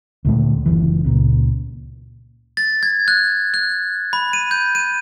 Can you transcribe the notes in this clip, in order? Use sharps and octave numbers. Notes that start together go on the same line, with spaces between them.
D2 A#2 A3
F#1 B1 E3
C#2 A#2
A6
G#6
F#6
F#6
B5
D#7
G6
D#7